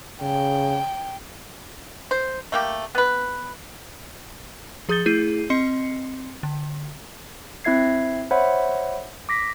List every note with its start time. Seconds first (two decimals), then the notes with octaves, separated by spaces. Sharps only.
0.22 C#3 G5
2.11 C5
2.52 A3 A#3 G4
2.95 B3 B4
4.89 F3 G#4 D#6 G6 A6 G7
5.06 A3 E4 G#4 G6 C7 D#7
5.50 C4 D#5 C6 C7 C#7
6.43 D3
7.64 C4 E4 E5 G#6 C7
8.31 C5 C#5 E5 F#5 B5
9.29 D6 A#6 B6